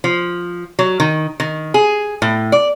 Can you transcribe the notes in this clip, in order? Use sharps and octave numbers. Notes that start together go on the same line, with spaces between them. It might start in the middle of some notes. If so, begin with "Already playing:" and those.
F3
F#3
D#3
D#3
G#4
A2
D5